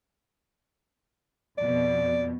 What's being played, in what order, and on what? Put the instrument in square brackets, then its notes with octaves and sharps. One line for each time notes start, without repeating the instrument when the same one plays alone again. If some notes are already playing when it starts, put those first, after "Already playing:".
[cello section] F2 B2 [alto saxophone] D5